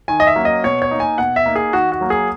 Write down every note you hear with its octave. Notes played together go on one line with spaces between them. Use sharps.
D#3 G#5
D#5
E5
F#3 A#3 C#4
D#5
B2 C#5
C#5
A#3 D#4
G#5
B2 F#5
E5
A#3 D#4
G#4
D#3 F#4
F#4
F#3 A#3
G#4